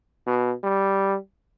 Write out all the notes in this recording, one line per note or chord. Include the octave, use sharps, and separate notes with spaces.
B2
G3